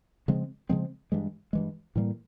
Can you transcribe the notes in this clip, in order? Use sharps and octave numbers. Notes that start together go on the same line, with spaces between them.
C#3 F3 G#3 C4
C#3 F3 G#3 C4
G2 E3 G#3
G2 E3 G#3
A2 E3 G3 A#3